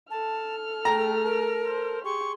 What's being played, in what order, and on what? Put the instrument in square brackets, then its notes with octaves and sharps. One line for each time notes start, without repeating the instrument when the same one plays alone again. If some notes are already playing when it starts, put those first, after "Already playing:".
[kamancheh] A4 F6 [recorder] A5
[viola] A3 G#4 [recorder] G5 [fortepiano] A#5
[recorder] A#4
[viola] C5
[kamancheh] G4 [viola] G#4 C6 [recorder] C#6